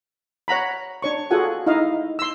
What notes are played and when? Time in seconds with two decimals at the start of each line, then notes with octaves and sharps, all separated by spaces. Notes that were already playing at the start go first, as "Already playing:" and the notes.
0.48 C#5 F#5 A#5 B5
1.02 D4 C#5 C#6
1.31 F4 F#4 G#4 A4 F#5 G#5
1.66 D#4 E4 D#5 F5
2.19 C6 E6